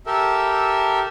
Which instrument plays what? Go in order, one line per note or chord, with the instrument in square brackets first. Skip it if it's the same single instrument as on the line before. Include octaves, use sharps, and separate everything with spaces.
[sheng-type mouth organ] G4 A4 A#4 E5